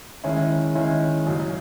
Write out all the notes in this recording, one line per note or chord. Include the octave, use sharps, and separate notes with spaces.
D#3 G#3 C#4 E4
D#3 G#3 C#4 E4
F#2 C#3 F#3